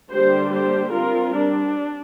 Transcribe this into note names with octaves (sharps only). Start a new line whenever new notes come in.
D3 G3 A#3 D4 G4 C5
G4 C5
G3 C4 F4 A#4
D4